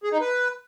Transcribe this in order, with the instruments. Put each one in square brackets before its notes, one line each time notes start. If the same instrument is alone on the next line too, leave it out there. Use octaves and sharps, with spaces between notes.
[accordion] G#4
D#4
B4